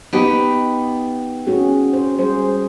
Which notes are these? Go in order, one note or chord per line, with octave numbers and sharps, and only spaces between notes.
B3 D#4 G4
C#4 F#4 G#4
C5
G3 G#4 C5